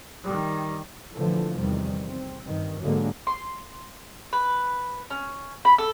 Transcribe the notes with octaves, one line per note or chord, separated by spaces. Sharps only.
D#3 G3
A#2 D3 E3 F3 A3
E2 C3 D#3 G3
C4
G2 D#3
G#2 D3 F#3 G#3 A#3
C6
B4
C#4
B5
A4